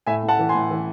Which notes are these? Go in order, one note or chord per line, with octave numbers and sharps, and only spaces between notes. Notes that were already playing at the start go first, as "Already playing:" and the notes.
A2 E5 G#5
A2
F#5 A5
E3
G#5 C6
A2
E3